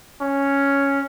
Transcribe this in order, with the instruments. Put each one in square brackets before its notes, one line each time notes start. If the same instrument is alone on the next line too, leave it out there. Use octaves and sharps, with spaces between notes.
[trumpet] C#4